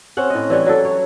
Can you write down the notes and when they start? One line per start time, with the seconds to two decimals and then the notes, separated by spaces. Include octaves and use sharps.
0.17 C4 C#4 F#5
0.30 A2 D#5
0.50 E3 G3 C#5
0.66 F#3 A4
0.85 C#5